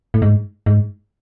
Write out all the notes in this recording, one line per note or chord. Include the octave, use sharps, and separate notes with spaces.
A2
G#2
G#2